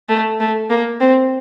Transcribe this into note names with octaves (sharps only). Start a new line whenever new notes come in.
A3
A3
A#3
C4